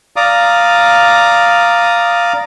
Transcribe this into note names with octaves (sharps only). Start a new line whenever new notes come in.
D5 F5 A#5 D6 D#6